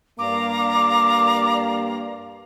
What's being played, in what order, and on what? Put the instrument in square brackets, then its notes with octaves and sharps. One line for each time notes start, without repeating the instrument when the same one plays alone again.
[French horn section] G2 A#3 [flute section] D5 F5 A#5 [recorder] D6